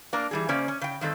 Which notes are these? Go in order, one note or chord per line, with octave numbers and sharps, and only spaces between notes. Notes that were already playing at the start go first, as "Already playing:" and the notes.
A#3 D4 A#4
E3 G3 G#4
C#3 A#3 C#4 C5 D5
C#4
C#3 G5
G2 D#3 C4 A4